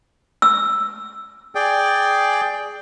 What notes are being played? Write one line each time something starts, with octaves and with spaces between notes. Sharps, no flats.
E6
G#4 D5 G5